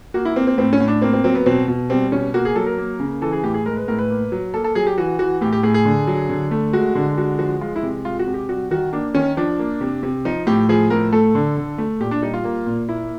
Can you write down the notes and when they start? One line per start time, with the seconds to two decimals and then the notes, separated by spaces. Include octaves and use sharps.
0.14 A#3 F#4
0.25 E4
0.36 A#3 C4
0.47 C4
0.58 A2 C4
0.73 C#4
0.80 A2
0.88 D4
1.02 A#3 C4
1.13 C4
1.24 F#3 C4
1.35 B3
1.46 B2 C4
1.68 B2
1.90 G3 C4
2.12 B2 C#4
2.34 A#3 F#4
2.45 G#4
2.55 F#3 A4
2.66 A#4
2.78 A#3
3.00 C#3
3.21 E3 A4
3.33 G#4
3.44 A2 G4
3.54 G#4
3.66 G#3 A#4
3.77 B4
3.88 A2 A#4
3.99 B4
4.10 A#3
4.32 F#3
4.54 A#3 A4
4.64 A4
4.75 F#3 G#4
4.87 G4
4.98 E3 F#4
5.19 E3 F#4
5.41 A2 G4
5.52 G4
5.63 A2 G#4
5.74 G#4
5.85 D3
6.07 F#3
6.29 D3
6.51 A3
6.73 G#3 F#4
6.95 D3
7.18 G#3 F#4
7.39 F3 F#4
7.61 G#3 F4
7.76 E4
7.83 C3
8.05 G#3 F4
8.19 F#4
8.27 C3
8.34 G4
8.49 G3 F#4
8.71 D#3 F#4
8.93 A#3 D4
9.15 D#3 C#4
9.37 F3 D4
9.59 A#3
9.81 C3
10.03 C3
10.25 F3 D#4
10.47 A2 G4
10.69 F3 G#4
10.90 A2 A#4
11.13 A3 A4
11.35 D3
11.57 D3
11.78 A3
12.00 A#2 G4
12.11 D4
12.22 G3 D#4
12.34 F4
12.44 A#3
12.66 A#2
12.89 A#3 E4